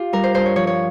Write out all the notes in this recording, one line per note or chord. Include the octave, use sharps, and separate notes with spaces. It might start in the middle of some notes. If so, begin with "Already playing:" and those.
Already playing: F4 G4
G3 A#4
C5
G2 C5
C#5
F3 C#5
C#5